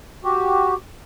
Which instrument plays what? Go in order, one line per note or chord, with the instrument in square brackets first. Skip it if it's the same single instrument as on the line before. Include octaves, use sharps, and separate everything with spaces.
[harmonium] F#4 G4